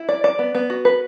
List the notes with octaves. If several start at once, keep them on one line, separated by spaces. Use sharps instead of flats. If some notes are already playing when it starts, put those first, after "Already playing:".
Already playing: E4
D5
D5
B3
B3
F#4
B4